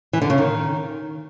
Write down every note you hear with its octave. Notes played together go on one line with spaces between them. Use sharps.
E3
D3
C#3
D#3